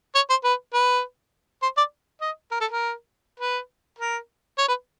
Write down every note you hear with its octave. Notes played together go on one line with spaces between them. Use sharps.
C#5
C5
B4
B4
C5
D5
D#5
A#4
A4
A#4
B4
A#4
C#5
B4